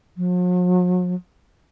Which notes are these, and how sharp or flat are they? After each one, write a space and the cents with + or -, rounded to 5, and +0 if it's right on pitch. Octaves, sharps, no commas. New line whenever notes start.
F#3 -45